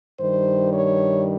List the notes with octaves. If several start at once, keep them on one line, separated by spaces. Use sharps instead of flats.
G2 D#3 G3 C5
C#5